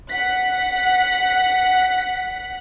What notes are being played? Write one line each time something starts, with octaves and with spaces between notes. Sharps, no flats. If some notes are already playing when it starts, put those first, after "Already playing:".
F#5 F#6 B6